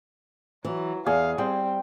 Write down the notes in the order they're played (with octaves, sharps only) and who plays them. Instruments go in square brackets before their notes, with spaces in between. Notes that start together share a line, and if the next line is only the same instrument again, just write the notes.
[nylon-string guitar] E3 [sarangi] F#3
[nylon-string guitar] E2 [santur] G#4 [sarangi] F5
[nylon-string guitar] G3 [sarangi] C4 [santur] G5